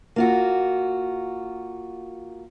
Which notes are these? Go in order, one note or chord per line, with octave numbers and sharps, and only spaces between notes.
A#3 F4 F#4